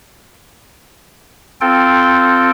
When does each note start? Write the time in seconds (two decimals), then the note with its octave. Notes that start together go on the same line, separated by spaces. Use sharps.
1.61 C4 F4 A4 G5